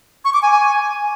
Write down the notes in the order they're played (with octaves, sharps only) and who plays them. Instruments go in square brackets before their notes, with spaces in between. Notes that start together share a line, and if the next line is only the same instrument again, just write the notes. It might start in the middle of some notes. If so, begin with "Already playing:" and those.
[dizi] C#6
D6
G#5